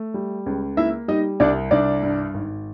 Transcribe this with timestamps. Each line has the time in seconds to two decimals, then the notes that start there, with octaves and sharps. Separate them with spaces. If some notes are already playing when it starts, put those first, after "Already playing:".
Already playing: A3
0.14 G3
0.46 C#2
0.77 A#3 E4 E5
1.08 G3 D#4 D#5
1.40 C2 D4 D5
1.71 C2 D4 D5
2.03 G2
2.34 G#1